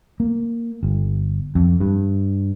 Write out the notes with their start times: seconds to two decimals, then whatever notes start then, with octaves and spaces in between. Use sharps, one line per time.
0.20 A#3
0.83 G1
1.55 F2
1.80 G2